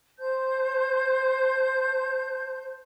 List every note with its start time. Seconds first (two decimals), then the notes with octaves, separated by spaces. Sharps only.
0.19 C5 A5 G6